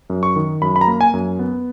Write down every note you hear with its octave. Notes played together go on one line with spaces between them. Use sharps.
F#2
C#6
D#3
F#2 B5
B5
A#5
A#3
G#5
F#2
B3